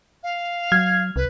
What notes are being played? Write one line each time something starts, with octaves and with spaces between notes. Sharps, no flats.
F5
F#3 F6 G#6
C2 B4